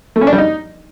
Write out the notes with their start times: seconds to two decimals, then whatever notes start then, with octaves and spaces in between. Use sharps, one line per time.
0.16 A3
0.21 C#4
0.27 D4
0.33 G3
0.38 D#4